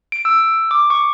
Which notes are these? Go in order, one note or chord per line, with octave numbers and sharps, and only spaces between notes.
D7
E6
D6
C#6